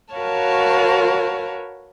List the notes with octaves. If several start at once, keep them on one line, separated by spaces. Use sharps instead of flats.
F#4 A#4 B4 C#5 F5 A5